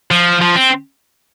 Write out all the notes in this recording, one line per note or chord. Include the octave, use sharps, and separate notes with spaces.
F3
F3
C4